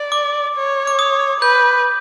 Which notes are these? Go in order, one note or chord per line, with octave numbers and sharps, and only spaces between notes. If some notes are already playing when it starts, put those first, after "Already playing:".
Already playing: D5
D6
C#5
D6
D#6
B4 G6